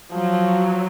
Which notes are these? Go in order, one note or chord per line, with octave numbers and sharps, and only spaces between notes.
F3 F#3